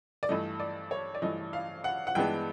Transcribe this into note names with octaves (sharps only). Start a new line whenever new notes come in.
D5
G2 E3 A3 D#5
D5
C#5
D5
G2 E3 A3 D#5
F5
F#5
F#5
G2 E3 G#3 B3 D4 G5